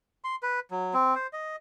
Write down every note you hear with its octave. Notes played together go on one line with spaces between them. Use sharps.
C6
B4
F#3
C4
C5
D#5